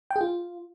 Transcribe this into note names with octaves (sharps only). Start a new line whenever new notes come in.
G5
G#4
F4